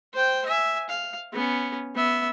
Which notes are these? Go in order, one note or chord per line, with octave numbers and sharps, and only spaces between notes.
C5 G5
E5 G#5
F5
B3 C#4
B3 E5